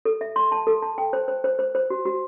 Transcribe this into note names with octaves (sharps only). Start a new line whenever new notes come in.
A4
E5
C6
A5
A4
A5
G5
C5
C5
C5
C5
C5
F#4
F#4